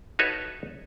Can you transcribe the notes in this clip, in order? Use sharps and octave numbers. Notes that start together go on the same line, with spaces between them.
D#4 F#4 A4 B4 C#5 E5